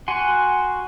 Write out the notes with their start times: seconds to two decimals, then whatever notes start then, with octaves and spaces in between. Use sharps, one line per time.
0.08 F#4 F#5 G#5 C6